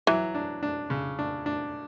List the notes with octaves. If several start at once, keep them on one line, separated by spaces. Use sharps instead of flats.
E3 F#3
D4
D4
C#3
D4
D4